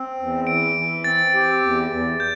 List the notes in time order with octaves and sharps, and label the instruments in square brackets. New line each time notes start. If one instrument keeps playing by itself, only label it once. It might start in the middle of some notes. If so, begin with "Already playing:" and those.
Already playing: [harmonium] C4
E2
[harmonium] E3 [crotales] D7
[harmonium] E3
[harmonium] C4 [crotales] A6
[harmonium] G4
E2
E2
[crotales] G6